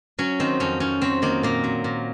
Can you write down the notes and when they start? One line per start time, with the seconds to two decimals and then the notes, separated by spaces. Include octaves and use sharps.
0.19 F#3 C#4
0.40 D#3 C4
0.60 F2 C#4
0.80 F2 C#4
1.02 F#3 C4
1.22 D#3 A#3
1.43 A#2 A#3
1.64 F#3
1.84 A#2